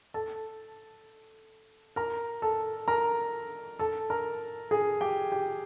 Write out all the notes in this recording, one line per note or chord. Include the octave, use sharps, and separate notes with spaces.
A4 A5
A#4 A#5
A4 A5
A#4 A#5
A4 A5
A#4 A#5
G#4 G#5
G4 G5
G4 G5